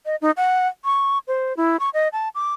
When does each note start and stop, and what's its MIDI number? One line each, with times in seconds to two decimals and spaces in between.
0.06 0.16 75
0.22 0.31 63
0.37 0.67 78
0.85 1.18 85
1.28 1.56 72
1.57 1.80 64
1.80 1.90 85
1.94 2.08 75
2.13 2.29 81
2.35 2.54 86